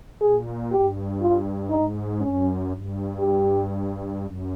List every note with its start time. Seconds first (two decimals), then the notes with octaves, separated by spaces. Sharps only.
0.21 A#2 G#4
0.72 G2 G4
1.21 F4
1.70 G#2 D#4
2.20 F#2 C#4
2.69 G2
3.20 G4
4.19 F#2